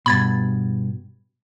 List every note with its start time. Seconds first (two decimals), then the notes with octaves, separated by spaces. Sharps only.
0.06 G2 B2 B5 G#6 A6